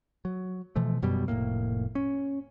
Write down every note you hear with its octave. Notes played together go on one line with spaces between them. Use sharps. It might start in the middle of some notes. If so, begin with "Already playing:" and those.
F#3
B2 E3 F3 A3
G1 F#2 B2 G3
F1 E2 A2 A#3
C#4